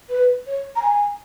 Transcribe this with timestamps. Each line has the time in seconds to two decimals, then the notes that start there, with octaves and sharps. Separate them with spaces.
0.09 B4
0.47 C#5
0.76 A#5
0.82 G#5